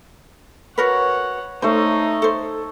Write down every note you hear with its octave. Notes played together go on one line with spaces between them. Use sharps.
F#4 A#4 B4 C#5 F#5
A3 D#4 C5 C#5 C6
A4 C5